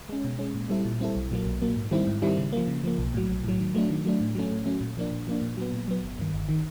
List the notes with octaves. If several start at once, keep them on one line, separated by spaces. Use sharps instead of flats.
G#3 C#4
B2
G#3 C#4
A#2
G3 C4 E4 A4
A#2
G3 C4 E4 A4
B1
A#2 F#3 A#3
B1
A#2 F#3 A#3
G#2
D#3 G3 C4 E4
G#2
D#3 G3 C4 E4
C#3
F3 A#3
C#3
F3 A#3
B1
A2 F#3
B1
A2 F#3
D#3
F#3 A3 D4
D#3
F#3 A3 D4
A2
F#3 A3 C#4
A2
F#3 A3 C#4
A#2
F3 A#3 D4
A#2
F3 A#3 D4
A#2
F#3 B3
A#2
F#3 B3
G1
G2 D#3
G1
D#3